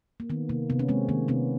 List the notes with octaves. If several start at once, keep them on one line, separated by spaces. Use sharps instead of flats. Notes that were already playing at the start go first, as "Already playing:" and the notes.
A#3
D#3 B3
C3 A#3
C3 B3
C#4
G#3 A#3 C4
D#3 A#3 C4
C3 B3 C#4